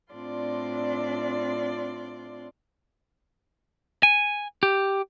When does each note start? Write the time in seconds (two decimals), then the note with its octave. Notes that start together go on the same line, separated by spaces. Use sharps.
0.13 A2 C4 D4 F4 D5 C6
4.03 G#5
4.63 G4